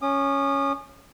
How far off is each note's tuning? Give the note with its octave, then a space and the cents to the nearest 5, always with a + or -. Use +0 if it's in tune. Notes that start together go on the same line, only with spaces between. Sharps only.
C#4 +0 D#6 -40